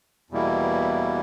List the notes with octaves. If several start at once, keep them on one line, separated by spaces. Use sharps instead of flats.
E2 B2 G3 A#3 E4